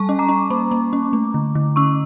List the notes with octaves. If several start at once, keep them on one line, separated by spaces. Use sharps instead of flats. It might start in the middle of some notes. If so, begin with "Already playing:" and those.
Already playing: G3 A5 C#6
C#4
A#5 D6
C#4
A#3
A#3
C#4
A3
D3
D3
C#4 C#6 E6